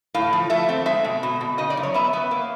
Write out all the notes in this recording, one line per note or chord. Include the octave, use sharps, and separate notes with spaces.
A2 F5
F3
A3 E5
C4
G#3 E5
B2
B2
B2
C#3 D#5
D5
F#2
C#5
B3 E5
B3
A#3